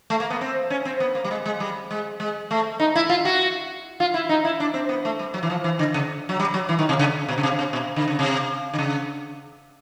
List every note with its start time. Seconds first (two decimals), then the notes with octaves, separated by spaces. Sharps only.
0.10 A3
0.20 A#3
0.30 B3
0.41 C4
0.70 C#4
0.85 C4
1.00 B3
1.15 A#3
1.24 G3
1.31 G#3
1.46 G#3
1.60 G3
1.91 G#3
2.20 G#3
2.51 A3
2.80 D#4
2.95 E4
3.09 F4
3.25 F#4
4.00 F4
4.14 E4
4.29 D#4
4.45 E4
4.60 D4
4.74 C4
4.89 B3
5.05 A3
5.19 G3
5.34 F#3
5.43 E3
5.50 F3
5.64 E3
5.79 D3
5.94 C#3
6.29 F#3
6.39 G3
6.54 F#3
6.69 E3
6.79 D#3
6.89 C3
6.99 C#3
7.29 B2
7.38 C#3
7.43 C3
7.59 C3
7.73 B2
7.96 D3
8.08 C#3
8.19 C3
8.74 D3
8.79 C#3